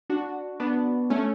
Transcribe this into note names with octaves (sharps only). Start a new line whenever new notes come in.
D4 F#4
B3 D4
A3 C#4